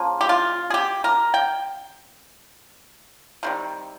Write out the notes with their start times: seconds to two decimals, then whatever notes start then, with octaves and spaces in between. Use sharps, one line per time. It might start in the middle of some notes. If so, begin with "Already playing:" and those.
Already playing: C#3 F3 A#3
0.21 G4
0.29 F4
0.70 G#4
0.74 G4
1.04 A#4
1.34 G5
3.43 C3 D#3 G3